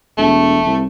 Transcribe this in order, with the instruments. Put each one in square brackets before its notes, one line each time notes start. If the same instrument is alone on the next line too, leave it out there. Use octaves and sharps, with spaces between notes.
[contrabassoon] E1 [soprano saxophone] A3
[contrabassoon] C2